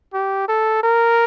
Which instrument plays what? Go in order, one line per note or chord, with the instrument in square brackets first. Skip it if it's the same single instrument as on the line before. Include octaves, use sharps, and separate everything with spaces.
[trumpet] G4
A4
A#4